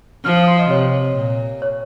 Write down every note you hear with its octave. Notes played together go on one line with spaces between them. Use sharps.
F3 F6
D#6
C6
D#5
C3 C#5
A#2
C#5